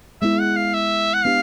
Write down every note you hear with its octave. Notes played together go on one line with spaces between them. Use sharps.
G#3 B3 E4 G#4 E5
F#5
F5
E5
F#5
B3 D4 G4 F5